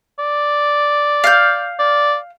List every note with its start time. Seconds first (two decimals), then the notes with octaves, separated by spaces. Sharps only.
0.19 D5
1.24 F5 F6 G6
1.79 D5